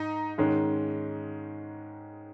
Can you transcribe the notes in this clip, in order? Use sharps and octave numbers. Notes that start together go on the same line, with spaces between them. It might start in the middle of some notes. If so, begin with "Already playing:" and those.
Already playing: G#2 D#4
G#2 D#3 G#3 C#4